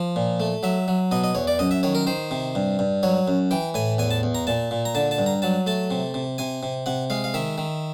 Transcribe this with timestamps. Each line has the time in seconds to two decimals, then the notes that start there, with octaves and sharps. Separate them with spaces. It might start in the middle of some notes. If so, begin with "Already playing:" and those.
Already playing: F3
0.16 A#2
0.40 A3
0.63 F#3 E5
0.88 F#3
1.11 B2 D#5
1.24 D#5
1.35 E2 C#5
1.47 D5
1.59 F#2 D#5
1.71 E5
1.83 D#3 C#5
1.95 A#4
2.07 D#3 C5
2.31 C3
2.55 G2
2.79 G2
3.03 F#3 C#5
3.28 F#2
3.51 E3 G5
3.74 A2 G#5
3.98 E2 G#5
4.11 A5
4.23 E2
4.35 A#5
4.47 A#2 A5
4.71 A#2
4.85 A#5
4.95 D3 A5
5.11 A5
5.18 G2
5.26 A#5
5.42 F#3 A5
5.67 A3 A5
5.91 C3
6.14 C3
6.38 C3 G#5
6.63 C3
6.86 C3 F#5
7.10 G#3 F5
7.24 F5
7.34 D#3 E5
7.58 D#3